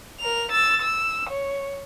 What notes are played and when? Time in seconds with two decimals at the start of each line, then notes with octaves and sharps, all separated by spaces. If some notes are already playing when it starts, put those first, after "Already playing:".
0.20 A#4 F7
0.51 E6 A6
0.82 E6
1.29 C#5